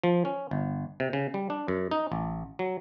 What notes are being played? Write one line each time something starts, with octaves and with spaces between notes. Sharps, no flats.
F3
C#4
G1
C3
C#3
G3
D4
F#2
D#4
A1
F#3